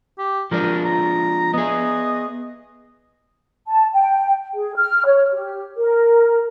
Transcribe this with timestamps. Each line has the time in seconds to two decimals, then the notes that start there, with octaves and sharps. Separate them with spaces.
0.18 G4
0.51 F3 G#3 D4 A#4
0.85 A#5
1.54 B3 G#4 D#5
3.68 A5
3.93 G5
4.54 G#4
4.76 F6
5.06 C#5
5.33 G4
5.78 A#4